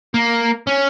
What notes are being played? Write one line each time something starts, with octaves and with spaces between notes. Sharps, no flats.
A#3
C#4